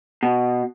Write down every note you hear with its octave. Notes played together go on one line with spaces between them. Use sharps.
B2